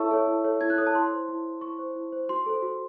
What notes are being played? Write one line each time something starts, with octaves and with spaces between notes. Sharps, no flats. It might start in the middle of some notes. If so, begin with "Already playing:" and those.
Already playing: E4 A4 C#5 E5 A5 C#6 E6
A4 C#5
E4
A4 C#5
E4 G#6
F#6
A4 C#5 D#6
A5
E4 C6
C5
E4
C5
E4 C#6
C5
E4
C5
F#4 C6
A4 C5
F#4